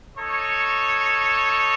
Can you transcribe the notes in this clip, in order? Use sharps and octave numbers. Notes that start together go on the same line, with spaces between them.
D#4 A4 C#5